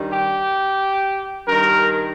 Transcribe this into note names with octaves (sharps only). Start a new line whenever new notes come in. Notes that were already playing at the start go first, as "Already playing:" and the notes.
Already playing: G2 D#3 G3
G4
G2 D#3 G3 A#4